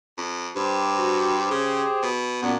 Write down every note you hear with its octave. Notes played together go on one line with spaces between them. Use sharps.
F2
G2 G4 C5
F#4
C#3 G#4
B2
F#2 A#2 B3 D4